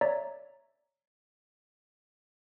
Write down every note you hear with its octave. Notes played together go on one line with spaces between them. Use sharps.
C#5 D5 E5 A#5